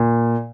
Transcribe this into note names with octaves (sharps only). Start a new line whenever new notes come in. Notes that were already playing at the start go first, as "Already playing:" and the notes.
Already playing: A#2